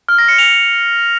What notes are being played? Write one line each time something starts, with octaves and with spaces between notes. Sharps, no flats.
F6
A#6
C#7
F7